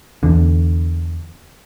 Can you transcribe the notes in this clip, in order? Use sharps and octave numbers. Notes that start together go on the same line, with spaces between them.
E2 D3